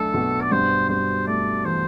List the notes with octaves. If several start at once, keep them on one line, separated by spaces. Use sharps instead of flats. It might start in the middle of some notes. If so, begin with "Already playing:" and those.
Already playing: B1 A3 D4 A4
B2
D5
G2 C5
G2 C5
A3 D5
E3 C5